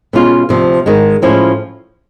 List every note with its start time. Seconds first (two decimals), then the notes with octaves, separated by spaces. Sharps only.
0.13 B2 G#3 C#4 F4
0.49 D2 C3 F3
0.86 G#2 D#3 G#3
1.22 A2 F3 G#3 C#4 E4